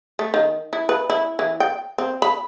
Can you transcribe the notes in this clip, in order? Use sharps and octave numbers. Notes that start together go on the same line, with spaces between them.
A3
D#3
E4
B4
E4
E3
G5
C4
B5